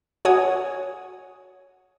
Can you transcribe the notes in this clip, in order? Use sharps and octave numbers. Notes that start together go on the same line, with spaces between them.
F#4 C#5 F#5 G#5 D#6